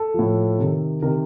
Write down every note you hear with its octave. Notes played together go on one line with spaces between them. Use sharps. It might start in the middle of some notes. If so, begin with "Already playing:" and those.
Already playing: A4
A2 F3
C3 D#3
C3 D#3 A#4